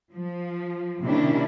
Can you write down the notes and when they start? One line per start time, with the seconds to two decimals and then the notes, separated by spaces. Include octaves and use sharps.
0.14 F3
1.03 C3 D#3 A#3 C#4 D4 E4